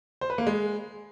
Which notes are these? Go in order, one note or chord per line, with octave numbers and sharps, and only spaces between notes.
C5
B4
A#3
G#3